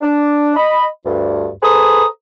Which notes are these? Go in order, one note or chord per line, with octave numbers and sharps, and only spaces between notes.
D4
D#5 B5
D2 G2
G#4 A4 B4 C5 A#5 D#6